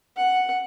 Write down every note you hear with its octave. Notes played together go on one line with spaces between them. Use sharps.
F#5